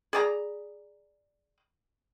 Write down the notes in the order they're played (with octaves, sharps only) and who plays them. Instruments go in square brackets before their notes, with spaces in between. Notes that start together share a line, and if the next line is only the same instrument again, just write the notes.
[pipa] G#4 D5 A#5